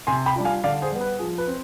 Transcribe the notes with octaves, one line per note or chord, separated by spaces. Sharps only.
C3 G#5 C6
G5 B5
G3 D4 F4
F5 G#5
D3 D5 F5
G#4 C5
G3 B3
B4
F3 G#4
B4
C4